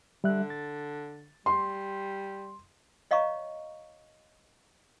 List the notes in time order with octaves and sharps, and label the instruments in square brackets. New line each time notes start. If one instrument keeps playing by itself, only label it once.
[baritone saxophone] D3 [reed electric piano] G3 E5 F#6
[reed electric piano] A6
[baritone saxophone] G3 [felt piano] C6
[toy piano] C#5 D#5 F5 A#5 C#6